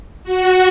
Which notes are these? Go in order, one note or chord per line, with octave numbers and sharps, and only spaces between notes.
F#4